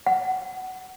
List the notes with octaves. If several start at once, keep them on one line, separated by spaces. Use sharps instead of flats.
F#5